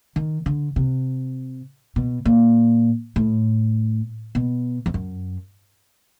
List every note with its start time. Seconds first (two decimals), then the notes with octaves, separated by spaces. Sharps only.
0.16 D#3
0.46 D3
0.76 C3
1.96 B2
2.25 A#2
3.16 A2
4.35 B2
4.86 F2
4.94 F#2